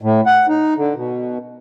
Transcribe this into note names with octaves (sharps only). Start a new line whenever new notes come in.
A2
F#5
D#4
D3
B2